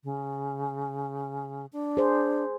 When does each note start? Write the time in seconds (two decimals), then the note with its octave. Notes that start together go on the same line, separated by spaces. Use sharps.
0.04 C#3
1.73 D4
1.97 G#4 C5